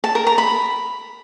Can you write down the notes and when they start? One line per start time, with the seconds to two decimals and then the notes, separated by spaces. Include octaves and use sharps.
0.04 A5
0.15 A#4
0.27 A#5
0.38 B5